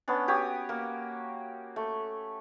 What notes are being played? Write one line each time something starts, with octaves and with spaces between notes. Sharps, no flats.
B3 C#4 D4
F#4 G4 C#5 D#6
A#3
A3